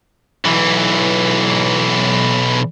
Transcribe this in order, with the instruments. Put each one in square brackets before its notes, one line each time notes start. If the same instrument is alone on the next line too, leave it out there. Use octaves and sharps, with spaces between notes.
[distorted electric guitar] B1 E3